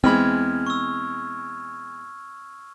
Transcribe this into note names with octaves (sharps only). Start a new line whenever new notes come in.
E2 G#3 C4 B5 F6 G#6
C#6 E6